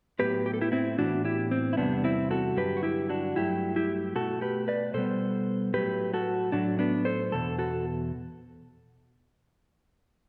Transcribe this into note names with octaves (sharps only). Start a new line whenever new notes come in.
A2 F#3 B3 G4 B4
G4
A4
E4 G4
C4 E4
A2 E3 B3 D4 F#4
E4 G4
C4
E4
E2 C3 G3 B3 D4
C4 E4
F#4 A4
G2 D3 F#3 G4 B4
F#4
E4 G4
D4 F#4
G2 F#3 A3 E4 G4
E4 G4
B2 A3 F#4 A4
G4 B4
B4 D5
B2 G3 B3 A4 C5
A2 F#3 A3 G4 B4
F#4 A4
A2 F#3 A3 D4 F#4
B3 D4
A4 C5
E2 B2 A4
F#4 A4